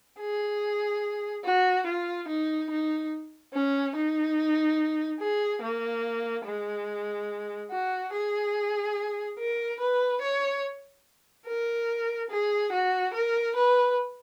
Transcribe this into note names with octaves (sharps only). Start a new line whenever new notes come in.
G#4
F#4
F4
D#4
D#4
C#4
D#4
G#4
A#3
G#3
F#4
G#4
A#4
B4
C#5
A#4
G#4
F#4
A#4
B4